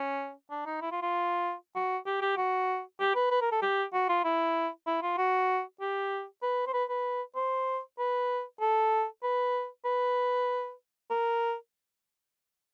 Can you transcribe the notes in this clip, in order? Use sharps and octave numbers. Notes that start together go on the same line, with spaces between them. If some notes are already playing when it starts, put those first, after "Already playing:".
Already playing: C#4
D4
D#4
E4
F4
F4
F#4
G4
G4
F#4
G4
B4
B4
A#4
A4
G4
F#4
F4
E4
E4
F4
F#4
G4
B4
C5
B4
B4
C5
B4
A4
B4
B4
A#4